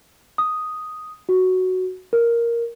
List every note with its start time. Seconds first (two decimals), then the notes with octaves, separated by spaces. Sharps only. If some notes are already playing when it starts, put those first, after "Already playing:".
0.38 D#6
1.29 F#4
2.13 A#4